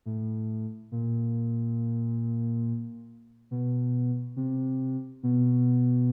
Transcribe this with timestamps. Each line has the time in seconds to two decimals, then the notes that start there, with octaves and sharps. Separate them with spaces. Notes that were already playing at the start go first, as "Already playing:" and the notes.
0.06 A2
0.92 A#2
3.51 B2
4.36 C3
5.23 B2